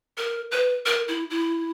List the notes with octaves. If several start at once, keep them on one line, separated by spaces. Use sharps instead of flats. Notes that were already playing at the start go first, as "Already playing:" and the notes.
A#4
B4
A#4
E4
E4